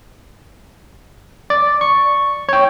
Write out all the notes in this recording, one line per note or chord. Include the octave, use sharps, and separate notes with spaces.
D5
C#6
C#5 G5